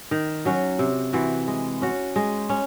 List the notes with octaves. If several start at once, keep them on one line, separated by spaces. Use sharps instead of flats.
D#3
F#3 C#4 F#4
C3
E3 C4 F#4
G#3
C#4 F#4
G#3
C#4